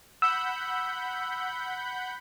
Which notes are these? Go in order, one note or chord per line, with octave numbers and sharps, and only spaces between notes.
F#5 B5 E6 G6